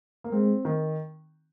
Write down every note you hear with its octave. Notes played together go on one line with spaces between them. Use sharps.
A#3
G#3 C4
D#3